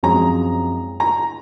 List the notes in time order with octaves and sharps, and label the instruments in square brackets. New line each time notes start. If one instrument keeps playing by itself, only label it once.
[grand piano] F#2 F3 G#3 C4 [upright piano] A#5
[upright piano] A#5